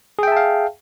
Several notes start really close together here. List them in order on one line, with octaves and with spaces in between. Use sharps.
G#4 G5 E5 A5 F5